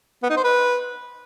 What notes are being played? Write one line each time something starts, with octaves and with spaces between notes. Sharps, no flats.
B3
D#4
C5
B4